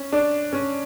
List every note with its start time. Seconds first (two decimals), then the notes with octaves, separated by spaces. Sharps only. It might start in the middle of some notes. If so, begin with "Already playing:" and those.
Already playing: C#4
0.12 D4
0.53 C#4